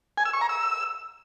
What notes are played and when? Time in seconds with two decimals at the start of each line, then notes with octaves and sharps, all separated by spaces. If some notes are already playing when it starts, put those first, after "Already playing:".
0.18 G#5
0.25 E6
0.33 C#6
0.41 A#5
0.49 E6